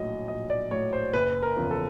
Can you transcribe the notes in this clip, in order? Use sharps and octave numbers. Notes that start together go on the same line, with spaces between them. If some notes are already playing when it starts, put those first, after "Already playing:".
Already playing: A#1 A2 F#3 D#5
A#1 D#5
D5
A2 F#3 C#5
C5
F#1 B4
A#4
E2 C#3 F3
A4